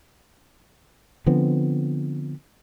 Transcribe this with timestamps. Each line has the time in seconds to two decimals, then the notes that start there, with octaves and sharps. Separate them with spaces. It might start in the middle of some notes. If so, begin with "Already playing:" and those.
1.26 D3 F3 B3 C4